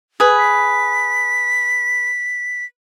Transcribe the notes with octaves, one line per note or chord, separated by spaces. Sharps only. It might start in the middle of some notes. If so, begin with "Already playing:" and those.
G#4 B4
B6